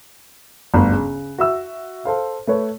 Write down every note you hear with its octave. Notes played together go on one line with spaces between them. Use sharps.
G1 D2 F#6
C#3
F#4 E5 E6
A4 C5 F5
A3 B4 C#5